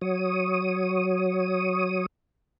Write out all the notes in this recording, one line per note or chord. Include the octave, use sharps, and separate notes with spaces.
F#3 C#5 D#6